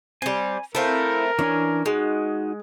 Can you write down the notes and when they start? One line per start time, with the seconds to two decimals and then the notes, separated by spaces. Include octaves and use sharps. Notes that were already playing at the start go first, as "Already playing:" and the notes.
0.22 G3 C4 G#5
0.75 A3 C4 E4 A#4 F5
1.39 E3 C#4 D4 G#5
1.86 G#3 D#4 F#4